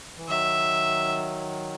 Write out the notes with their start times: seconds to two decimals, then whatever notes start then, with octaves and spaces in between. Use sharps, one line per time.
0.17 E3
0.28 D#3 F#3 E5